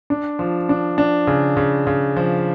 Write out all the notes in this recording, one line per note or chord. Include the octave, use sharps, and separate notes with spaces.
D4
F3
D4
D4
C#3
C#3
C#3
F3